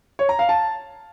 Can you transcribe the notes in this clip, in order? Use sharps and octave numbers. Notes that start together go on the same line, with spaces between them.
C#5
A#5
F5
A5